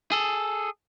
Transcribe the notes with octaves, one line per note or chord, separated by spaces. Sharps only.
G#4 A4